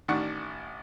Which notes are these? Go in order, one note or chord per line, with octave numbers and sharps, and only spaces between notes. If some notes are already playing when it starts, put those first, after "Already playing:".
A1 D#3 D4 F#5 C#6